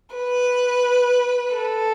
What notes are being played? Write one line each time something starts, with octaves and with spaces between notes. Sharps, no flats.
B4
A4